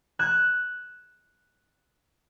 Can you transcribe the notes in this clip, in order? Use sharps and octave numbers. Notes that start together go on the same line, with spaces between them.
F#6 G#6 E7